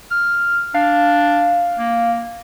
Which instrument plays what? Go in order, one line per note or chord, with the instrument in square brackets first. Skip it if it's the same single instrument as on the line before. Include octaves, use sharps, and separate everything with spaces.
[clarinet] F6
[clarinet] D4 [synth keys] F5
[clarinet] A#3